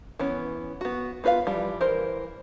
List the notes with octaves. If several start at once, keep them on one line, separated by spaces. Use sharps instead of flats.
E3 B3 C#4
B3 F#4
B3 F4 B4 C#5 F5
E3 F3 G3
E3 A#4 C5